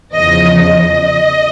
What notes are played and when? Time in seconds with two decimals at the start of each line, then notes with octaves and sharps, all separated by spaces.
0.13 E2 C#3 F3 D#5
0.62 D#5